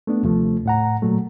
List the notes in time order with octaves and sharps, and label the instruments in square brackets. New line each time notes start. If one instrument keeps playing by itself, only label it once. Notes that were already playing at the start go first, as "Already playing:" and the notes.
[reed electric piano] A3 B3 D4
D#2 C3 F3 A3
A2 F#5 A#5
A#2 F#3 A3